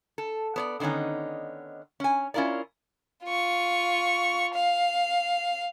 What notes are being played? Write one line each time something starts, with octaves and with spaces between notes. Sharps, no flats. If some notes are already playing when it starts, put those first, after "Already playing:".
A4
B3 C#5 D5
D3 D#3 B3 C#4 D#4
C#4 G#5
C#4 E4 F4 A#4 D5
F4 C#6
F5